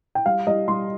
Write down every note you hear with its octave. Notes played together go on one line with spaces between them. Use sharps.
G5
G3 F5
G3 D#5
G3 C6